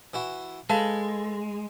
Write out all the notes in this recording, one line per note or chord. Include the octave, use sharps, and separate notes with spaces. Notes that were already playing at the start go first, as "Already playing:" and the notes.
E3 E4 F#4
G#3 A4 B4 F5 A5